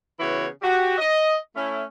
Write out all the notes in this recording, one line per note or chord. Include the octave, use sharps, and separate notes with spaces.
C#3 E3 B3 E4 F#4 C#5
F#4 G4
D#5
A3 C#4 E4